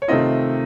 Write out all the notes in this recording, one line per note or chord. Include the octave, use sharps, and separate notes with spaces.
C#5
C3 D#3 A3 C4 F4 D#5